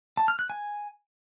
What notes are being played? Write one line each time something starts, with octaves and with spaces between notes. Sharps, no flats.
A5
F6
F#6
G#5